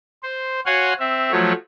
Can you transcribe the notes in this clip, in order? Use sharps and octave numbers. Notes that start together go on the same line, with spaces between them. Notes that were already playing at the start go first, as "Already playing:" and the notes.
C5
F#4 C#5 F5 F#5 G#5 C6
C4 E5
F3 F#3 A3 C#5